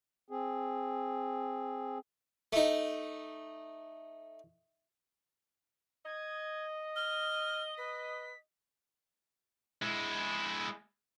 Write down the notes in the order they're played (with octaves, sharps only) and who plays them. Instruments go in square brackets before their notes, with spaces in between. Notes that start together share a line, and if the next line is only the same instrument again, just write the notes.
[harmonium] C4 G#4
[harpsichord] A3 D#4
[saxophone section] D#5 [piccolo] G#6
[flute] F6 [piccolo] G7
[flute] B4 [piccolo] B6
[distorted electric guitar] G#3 E4